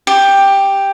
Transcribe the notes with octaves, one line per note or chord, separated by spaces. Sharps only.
G4